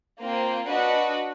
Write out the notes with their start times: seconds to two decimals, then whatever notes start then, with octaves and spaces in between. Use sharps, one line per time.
0.20 A#3 C4 F4
0.68 D4 F#4 B4 D#5